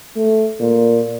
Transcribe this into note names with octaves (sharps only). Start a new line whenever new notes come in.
A3
A#2